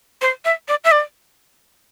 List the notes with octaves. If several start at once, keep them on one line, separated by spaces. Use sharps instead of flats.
C5
E5
D5
E5
D5